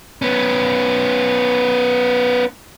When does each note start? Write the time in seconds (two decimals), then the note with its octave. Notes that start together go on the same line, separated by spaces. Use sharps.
0.22 B3 C#4